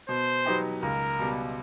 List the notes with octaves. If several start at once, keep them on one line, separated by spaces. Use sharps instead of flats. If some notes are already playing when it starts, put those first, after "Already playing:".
B2 C5
F#3 B3 D#4 G4
C#2 A#4
B2 G3